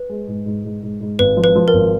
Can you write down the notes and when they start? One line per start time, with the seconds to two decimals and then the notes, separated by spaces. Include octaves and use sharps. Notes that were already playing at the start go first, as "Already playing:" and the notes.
Already playing: B4
0.09 G#3
0.27 G#2
0.46 G#2
0.65 G#2
0.83 G#2
1.01 G#2
1.19 G#1 B4
1.37 F3
1.44 B4
1.55 F3
1.68 A#4
1.73 G#1